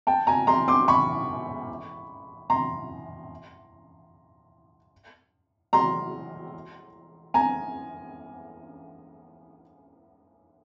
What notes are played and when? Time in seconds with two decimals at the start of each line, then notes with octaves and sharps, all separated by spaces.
0.07 G5 A5
0.27 G#5 A#5
0.47 A#5 C6
0.68 C6 D6
0.88 B5 C#6
2.50 A#5 C6
5.73 A#5 C6
7.34 G#5 A#5